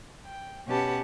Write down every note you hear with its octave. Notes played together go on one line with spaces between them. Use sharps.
G5
B2 C#4 G4 B4 F#5 A5